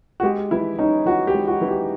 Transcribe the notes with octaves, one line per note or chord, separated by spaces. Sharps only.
F#4
G#3 G4
E3 E4
C#4 D#4
E3 F#4
G4
G#3
F#4
E3
G4